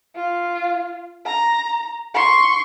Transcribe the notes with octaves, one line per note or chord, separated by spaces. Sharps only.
F4
A#5
C6 C#6